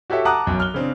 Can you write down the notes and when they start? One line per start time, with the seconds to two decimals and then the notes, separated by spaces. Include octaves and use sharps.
0.10 F#4 G4 A4 C#5 E5
0.25 F#5 A5 A#5 D6 D#6 F#6
0.47 B1 F#2
0.60 F6 G7
0.74 C#3 C4 D4